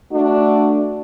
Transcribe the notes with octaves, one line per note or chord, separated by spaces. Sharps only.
A3 D4 F#4